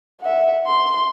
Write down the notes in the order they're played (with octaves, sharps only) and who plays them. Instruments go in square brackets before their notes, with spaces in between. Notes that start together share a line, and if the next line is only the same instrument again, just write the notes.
[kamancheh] E5 F#5
C6